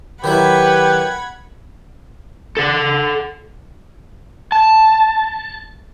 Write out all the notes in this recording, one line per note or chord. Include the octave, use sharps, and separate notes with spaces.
D#3 F#3 E4 G4 B4 F#5 B5 G#6
A4 F#5
A5